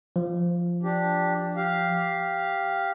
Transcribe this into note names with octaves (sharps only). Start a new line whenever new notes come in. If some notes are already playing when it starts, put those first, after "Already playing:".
F3
D4 G4
G4 F5